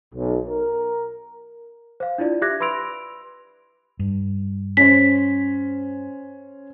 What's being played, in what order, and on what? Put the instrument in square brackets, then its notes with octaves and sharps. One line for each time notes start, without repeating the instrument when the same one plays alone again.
[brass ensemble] B1
A#4
[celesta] C5 F5
D4 E4 F4 D5
G4 E5 D6 F#6 G#6 A#6
B4 B5 C6 E6 D7 F7
[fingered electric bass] G2
[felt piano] C#4 C5 [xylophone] B6